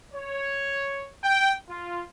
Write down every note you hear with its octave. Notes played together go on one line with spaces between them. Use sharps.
C#5
G5
F4